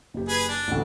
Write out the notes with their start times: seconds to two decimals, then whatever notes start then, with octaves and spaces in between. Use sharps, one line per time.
0.14 F#1 G4
0.29 G#4 B4
0.49 D4
0.68 A1 D2